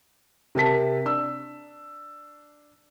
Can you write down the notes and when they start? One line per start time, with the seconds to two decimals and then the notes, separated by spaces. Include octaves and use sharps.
0.55 C3 A#4 A5 B6
1.05 D4 E6